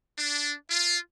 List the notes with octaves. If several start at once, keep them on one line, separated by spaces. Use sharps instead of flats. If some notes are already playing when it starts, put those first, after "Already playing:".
D4
F4